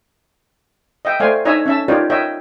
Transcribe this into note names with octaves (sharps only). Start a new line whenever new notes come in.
D#5 E5 G5
A3 C5 D5 F5 G#5
D4 D#4 C#5 E5 G#5 A#5
C#4 E5 A5
D#4 F4 G4 A#4 C#5 D5
A#4 C#5 D#5 E5 G5